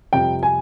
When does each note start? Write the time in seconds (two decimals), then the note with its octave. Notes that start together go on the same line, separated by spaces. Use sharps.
0.13 F2 C3 G3 C4 G5
0.43 G#5